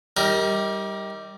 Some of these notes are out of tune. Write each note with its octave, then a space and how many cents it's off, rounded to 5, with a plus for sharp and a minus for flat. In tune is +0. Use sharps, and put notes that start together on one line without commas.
G3 +0 D#4 +40 A#4 +0